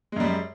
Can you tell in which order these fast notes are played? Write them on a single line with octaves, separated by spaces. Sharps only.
G#3 F#2 G3